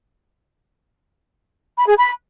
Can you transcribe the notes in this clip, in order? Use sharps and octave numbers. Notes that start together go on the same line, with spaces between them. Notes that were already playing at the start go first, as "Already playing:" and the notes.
B5
G#4
B5